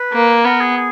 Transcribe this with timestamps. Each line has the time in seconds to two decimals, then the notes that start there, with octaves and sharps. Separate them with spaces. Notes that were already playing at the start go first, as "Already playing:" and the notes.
Already playing: B4
0.13 A#3
0.45 B3 A#4
0.61 G#4
0.76 G#4